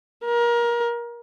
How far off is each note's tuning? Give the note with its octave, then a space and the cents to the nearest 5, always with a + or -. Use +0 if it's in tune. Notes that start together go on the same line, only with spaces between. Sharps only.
A#4 +25